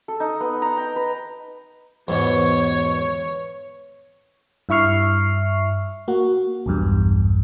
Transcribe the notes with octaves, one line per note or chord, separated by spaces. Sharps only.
A4
D#4
B3
A#5
G5
B4
E2 G#2 B2 C#5
G2 E4 E5 C#6 F6 C7
A#3 F#4
B1 E2 G2